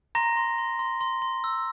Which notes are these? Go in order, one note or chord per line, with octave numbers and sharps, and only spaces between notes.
A#5 C6 A#6
C6
C6
C6
C6
C6
E6